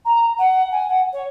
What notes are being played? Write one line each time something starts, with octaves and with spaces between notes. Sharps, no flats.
A#5
F#5
G#5
F#5
C#5